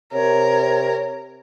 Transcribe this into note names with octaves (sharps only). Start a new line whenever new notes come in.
C3 A#4 C#5